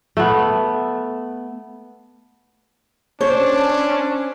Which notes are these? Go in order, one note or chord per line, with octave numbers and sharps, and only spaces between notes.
A3 B3
C#4 D4 C5 C#5